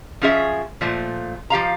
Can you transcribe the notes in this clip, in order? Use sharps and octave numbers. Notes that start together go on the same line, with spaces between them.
F3 C#4 G#4 E5
A#2 F3 A3
F3 G4 F5 A#5